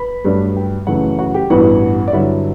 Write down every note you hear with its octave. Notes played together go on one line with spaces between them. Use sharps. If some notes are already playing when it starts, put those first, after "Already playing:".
Already playing: B4 B5
G2 F#3 A3 D4
G4 G5
F#2 C#3 E3 A3 F#4 F#5
F#4 F#5
G4 G5
A1 G2 E3 B3 E4 F#4 F#5
D5
G2 D3 F#3 E4 E5